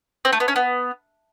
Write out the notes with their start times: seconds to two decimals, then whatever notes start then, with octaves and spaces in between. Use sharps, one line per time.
0.25 C4
0.33 A3
0.40 B3
0.48 C#4
0.56 B3